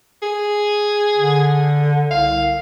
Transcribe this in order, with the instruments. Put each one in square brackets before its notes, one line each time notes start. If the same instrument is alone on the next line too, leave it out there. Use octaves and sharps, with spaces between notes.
[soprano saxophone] G#4
[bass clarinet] D3
[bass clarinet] C2 [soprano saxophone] F5